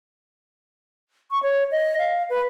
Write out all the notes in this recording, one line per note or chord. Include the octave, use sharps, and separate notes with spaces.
C#6
C#5
D#5
F5
B4